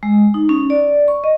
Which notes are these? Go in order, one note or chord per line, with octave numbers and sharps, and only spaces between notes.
G#3
D#4
C#4
D5
C#6
D#5